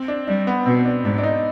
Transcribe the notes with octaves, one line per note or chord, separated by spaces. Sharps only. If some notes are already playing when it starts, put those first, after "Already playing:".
Already playing: C4
D4
G3 D4
B3
B2 C4
D4
G#2 D4
D4
D#4